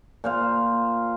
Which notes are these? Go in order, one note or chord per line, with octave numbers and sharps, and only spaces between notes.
A#2 C5 F5